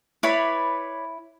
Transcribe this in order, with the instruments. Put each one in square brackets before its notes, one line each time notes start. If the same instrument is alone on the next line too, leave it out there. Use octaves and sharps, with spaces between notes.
[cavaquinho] E4 B5 [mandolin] B4 C#5 D5